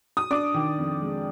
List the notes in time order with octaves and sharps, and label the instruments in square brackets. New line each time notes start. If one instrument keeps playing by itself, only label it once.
[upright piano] D#6
D4 D5 D6
D#3
F2
G#3